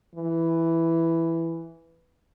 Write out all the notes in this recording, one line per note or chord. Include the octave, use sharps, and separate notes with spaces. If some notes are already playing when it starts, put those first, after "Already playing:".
E3